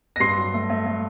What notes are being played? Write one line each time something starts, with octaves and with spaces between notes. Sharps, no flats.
A#6
G2 C6 C7
F#3
A3
A3
A3